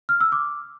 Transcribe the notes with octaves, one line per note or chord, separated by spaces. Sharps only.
F6
E6
D6